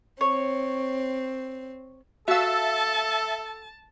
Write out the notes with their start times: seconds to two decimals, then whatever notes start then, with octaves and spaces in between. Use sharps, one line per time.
0.21 C4 C#5
2.28 F#4 A4 E5 F5 A5 E6